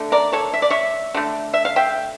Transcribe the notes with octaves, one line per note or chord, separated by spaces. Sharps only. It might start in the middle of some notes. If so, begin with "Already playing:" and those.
Already playing: D3 A3
A#4 D5
A4 C#5
E5
D5
C#5 E5
D3 A3
E5
F5
E5 G5